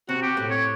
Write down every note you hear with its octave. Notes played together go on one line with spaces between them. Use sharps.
C3 C4 F#4
G4
A2 A3
C#5